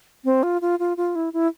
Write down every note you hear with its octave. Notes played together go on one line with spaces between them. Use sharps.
C4
F4
F4
F4
F4
E4
E4